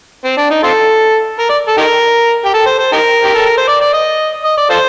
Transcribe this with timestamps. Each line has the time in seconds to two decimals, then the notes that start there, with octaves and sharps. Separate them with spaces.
0.25 C4
0.38 D4
0.51 D#4
0.63 C4 F4 A4
1.39 A#4
1.49 D5
1.68 A4
1.78 D#4 G4 A#4
2.45 G4
2.54 A4
2.66 C5
2.79 C5
2.92 D#4 G4 A#4
3.24 G4
3.35 A4
3.46 A#4
3.57 C5
3.68 D5
3.81 D5
3.93 D#5
4.45 D#5
4.57 D5
4.70 F4 A4 C5